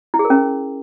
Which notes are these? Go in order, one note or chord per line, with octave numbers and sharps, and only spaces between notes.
E4
G#4
A#4
C#4